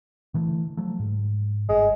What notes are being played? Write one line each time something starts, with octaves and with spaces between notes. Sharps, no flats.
D3 E3 A3
F3 F#3 A3
G#2
G1 G#3